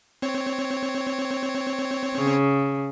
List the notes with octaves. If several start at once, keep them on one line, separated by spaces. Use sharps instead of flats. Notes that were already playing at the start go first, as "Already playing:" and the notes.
C4 C#5
C#3